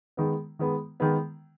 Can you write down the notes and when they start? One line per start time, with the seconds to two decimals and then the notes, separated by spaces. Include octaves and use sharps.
0.17 D#3 G#3 B3
0.59 D#3 G#3 B3
1.00 D#3 G#3 B3